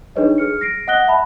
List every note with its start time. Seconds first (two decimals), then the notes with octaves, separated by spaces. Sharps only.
0.16 D4 D#4 G#4 B4 C#5 D#5
0.38 G#4 F6 C#7
0.61 A#6 C7 D7
0.87 D#5 F#5 D#6 F#6 A#6 G7
1.07 E5 A5 B5